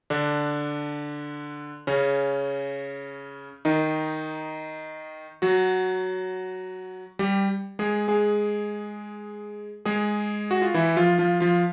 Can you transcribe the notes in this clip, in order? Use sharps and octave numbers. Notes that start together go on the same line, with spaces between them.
D3 D4
C#3 C#4
D#3 D#4
F#3 F#4
G3 G4
G#3 G#4
G#3 G#4
G#3 G#4
F#4
F4
E3 E4
F3 F4
F3 F4
F3 F4